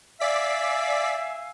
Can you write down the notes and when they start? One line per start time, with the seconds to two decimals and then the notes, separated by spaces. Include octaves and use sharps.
0.20 D5 E5 F5 G#5 E6 B6